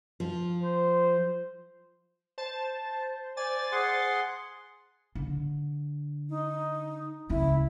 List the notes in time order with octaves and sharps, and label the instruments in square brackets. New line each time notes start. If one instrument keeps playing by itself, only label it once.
[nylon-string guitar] F3
[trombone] C5
[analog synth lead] C5 [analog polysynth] A5
[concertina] D5 G#5 [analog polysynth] A6
[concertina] G#4 F#5 C6
[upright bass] D3
[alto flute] D#4
[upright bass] C#2 C#4 [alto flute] E4